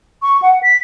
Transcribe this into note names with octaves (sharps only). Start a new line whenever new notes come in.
C#6
F#5
B6